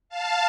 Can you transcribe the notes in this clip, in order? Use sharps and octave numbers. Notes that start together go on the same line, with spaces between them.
F5 A5